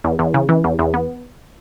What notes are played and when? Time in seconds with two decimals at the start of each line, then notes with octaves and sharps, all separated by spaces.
0.04 E2
0.19 E2
0.34 C#3
0.49 E3
0.64 E2
0.79 E2
0.94 B3